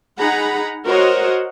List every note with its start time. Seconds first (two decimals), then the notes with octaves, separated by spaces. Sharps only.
0.19 D#4 G#4 F#5 A#5 B5
0.85 F#4 A#4 C5 C#5 D#5 F#5